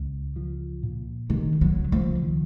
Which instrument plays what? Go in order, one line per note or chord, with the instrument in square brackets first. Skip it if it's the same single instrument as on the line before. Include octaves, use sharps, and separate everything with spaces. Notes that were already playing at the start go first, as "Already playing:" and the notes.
Already playing: [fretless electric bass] C#2
F3
A#2
[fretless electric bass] C3 [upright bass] D#3
[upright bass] F#3
[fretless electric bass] C#2
[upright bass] F3
[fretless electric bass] D#3